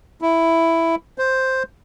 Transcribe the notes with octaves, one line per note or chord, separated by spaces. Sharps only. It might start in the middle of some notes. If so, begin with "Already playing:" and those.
E4
C5